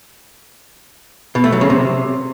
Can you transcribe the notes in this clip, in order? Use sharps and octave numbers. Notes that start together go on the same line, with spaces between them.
B2
A3
F#3
C#3
C3